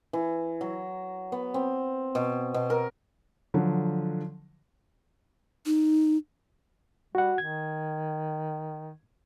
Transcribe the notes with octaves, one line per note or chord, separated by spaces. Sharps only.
E3
F#3
B3
C4
B2
B2
A#4
D3 F3 F#3
D#4
G3 F#4 F#5
D#3 G#6